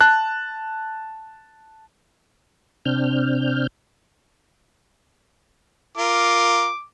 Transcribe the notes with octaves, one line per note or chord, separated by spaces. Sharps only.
A5 F#6
C3 C4 D4 F6 G6
F4 A#4 D6